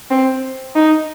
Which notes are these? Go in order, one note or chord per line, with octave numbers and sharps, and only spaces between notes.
C4
D#4